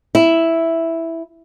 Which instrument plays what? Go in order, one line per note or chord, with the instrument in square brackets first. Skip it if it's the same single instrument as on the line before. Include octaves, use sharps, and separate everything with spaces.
[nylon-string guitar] E4